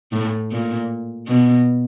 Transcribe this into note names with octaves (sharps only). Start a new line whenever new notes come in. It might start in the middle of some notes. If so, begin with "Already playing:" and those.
A2
A#2
B2